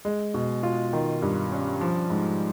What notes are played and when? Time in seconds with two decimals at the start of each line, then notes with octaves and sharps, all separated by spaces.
0.05 G#3
0.34 B2
0.63 F4
0.93 D#3
1.22 G2
1.51 C#4
1.81 F3
2.10 G#2